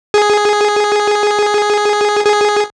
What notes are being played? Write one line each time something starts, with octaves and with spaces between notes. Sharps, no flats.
G#4
G#4